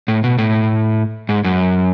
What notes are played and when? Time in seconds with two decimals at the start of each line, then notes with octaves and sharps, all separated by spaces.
0.08 A2
0.24 B2
0.38 A2
1.29 G#2
1.44 F#2